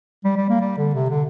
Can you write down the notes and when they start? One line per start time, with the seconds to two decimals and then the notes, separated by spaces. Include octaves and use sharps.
0.25 G3
0.37 G3
0.50 A#3
0.61 G3
0.78 D3
0.95 C3
1.10 D3